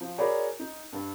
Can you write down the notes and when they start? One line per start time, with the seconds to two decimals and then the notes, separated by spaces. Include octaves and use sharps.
0.01 F3
0.18 F#4 G#4 A#4 C#5 D5 B5
0.59 D#4
0.93 G2